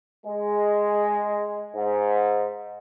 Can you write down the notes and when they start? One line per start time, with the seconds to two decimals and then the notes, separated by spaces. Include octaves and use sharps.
0.24 G#3
1.75 G#2